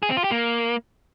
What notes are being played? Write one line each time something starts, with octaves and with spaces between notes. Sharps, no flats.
G#4
C4
F4
G4
A#3